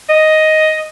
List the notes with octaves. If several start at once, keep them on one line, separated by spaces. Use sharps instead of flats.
D#5